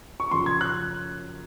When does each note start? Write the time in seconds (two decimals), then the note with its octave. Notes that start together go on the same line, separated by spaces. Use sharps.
0.20 C#6
0.31 F#2 C#3 F3 C6
0.46 G#6
0.61 F#6